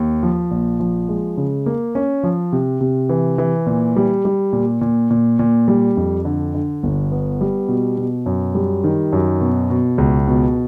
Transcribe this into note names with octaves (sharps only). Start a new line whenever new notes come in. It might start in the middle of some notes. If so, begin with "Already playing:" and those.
Already playing: D#2
F3
A#1
F3
G#3
C#3
A#3
C#4
F3
C3
C3
E3
E3
A#2
G3
G3
A#2
A#2
A#2
A#2
G3
F2
D3
D3
G1
B3
G3
B2
B2
F#2
G3
D#3
F#2
B2
B2
C#2
B2